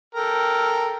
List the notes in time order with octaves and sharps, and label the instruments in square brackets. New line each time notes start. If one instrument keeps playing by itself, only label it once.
[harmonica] A4 A#4 G5